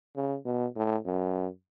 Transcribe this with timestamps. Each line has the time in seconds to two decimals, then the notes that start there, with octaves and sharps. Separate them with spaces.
0.16 C#3
0.45 B2
0.76 A2
1.06 F#2